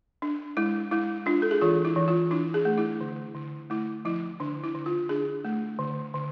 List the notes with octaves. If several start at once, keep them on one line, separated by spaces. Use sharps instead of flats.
D4
G#3 E4
G#3 E4
D4 F4
A4
G#4
E3 F4
E4
E3
F4
D4 E4
G#4
A3
E4
D3
D3
A3 E4
F3 E4
D3 D4
E4
D3
F4
D4 G#4
A3
D3
D3